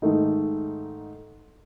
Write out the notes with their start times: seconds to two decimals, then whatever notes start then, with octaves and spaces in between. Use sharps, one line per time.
0.02 G#2 D#3 A3 D#4